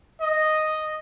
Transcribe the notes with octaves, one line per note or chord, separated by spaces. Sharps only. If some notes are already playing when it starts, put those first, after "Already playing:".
D#5